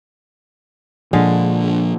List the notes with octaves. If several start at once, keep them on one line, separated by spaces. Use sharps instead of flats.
A#2 D3 F3 G#3 F5